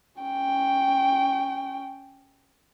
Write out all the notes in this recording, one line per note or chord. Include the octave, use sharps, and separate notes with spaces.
C#4 G5